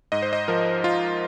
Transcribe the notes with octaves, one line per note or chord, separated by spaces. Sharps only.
G#2 D#5
C5
D#5
F3 A#4
F3 F4